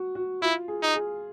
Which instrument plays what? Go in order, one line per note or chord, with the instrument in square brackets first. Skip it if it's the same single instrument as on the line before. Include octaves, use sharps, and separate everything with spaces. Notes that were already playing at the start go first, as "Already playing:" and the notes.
Already playing: [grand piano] F#4
F#4
[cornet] E4 [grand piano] F4
[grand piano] G#4
[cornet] D#4
[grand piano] G#4